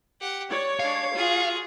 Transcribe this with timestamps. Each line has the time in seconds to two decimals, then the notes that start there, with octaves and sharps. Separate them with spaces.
0.21 G4 F#5
0.51 C#5 D5
0.79 G#3 D4 F5
1.15 F4 F#4 G#4